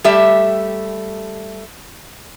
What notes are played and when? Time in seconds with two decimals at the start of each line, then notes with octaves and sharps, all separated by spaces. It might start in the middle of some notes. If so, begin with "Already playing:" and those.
0.04 G3 A3 G4 E5